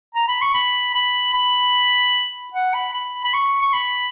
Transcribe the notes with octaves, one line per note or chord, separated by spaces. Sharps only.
A#5
B5
C#6
B5
B5
B5
F#5
B5
B5
B5
C#6
C#6
B5